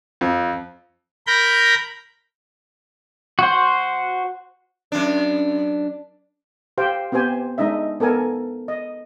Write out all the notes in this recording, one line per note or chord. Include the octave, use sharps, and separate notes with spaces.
F2
A#4 B5 G6 A#6
F#4 C5
F#2 D4
G4 C5 F5 G5
B3 C4 G4 C5 G#5
G#3 D4 D#4 D#5 E5
B3 A4 A#4 G#5
D#5